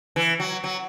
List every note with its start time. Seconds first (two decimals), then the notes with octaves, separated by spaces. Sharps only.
0.16 E3
0.40 F#3
0.64 F#3